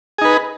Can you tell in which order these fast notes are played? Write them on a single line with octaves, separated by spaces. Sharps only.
G#4 D#4 B4